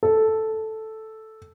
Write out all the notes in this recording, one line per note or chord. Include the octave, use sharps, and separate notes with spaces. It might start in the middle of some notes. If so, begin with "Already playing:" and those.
A4